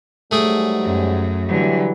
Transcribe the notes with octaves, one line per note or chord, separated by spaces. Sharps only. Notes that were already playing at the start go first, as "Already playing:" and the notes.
G#2 F#3 G3 A3 G#4 G5
F#2
D3 E3 F#3 G3